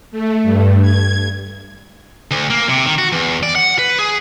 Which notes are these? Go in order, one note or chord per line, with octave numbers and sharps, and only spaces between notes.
A3
G2
G#6
D2
A#3
C3
D#3
F#4
E2
D5
F#5
B4
G#4